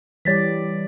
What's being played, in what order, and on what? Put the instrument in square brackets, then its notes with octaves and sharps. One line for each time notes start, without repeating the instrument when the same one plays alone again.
[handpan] E3 G3 D5 [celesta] C#5 A6 B6